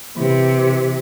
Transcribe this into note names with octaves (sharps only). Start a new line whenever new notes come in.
C3 E3